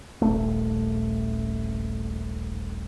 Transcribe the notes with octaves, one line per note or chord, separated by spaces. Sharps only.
D#1 A#1 A3